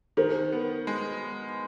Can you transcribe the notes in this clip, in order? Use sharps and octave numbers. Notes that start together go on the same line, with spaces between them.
D#3 A#4 C5
B3
G#3